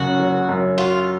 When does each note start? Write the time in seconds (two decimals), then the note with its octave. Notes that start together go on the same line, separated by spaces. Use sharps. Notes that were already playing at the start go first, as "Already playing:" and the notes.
Already playing: F#1 F#2 C#3 F#4
0.20 F#1
0.49 F#2
0.78 F4 F#4